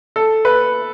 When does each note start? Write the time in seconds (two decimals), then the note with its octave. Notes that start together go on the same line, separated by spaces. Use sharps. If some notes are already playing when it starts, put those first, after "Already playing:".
0.16 A4
0.45 B4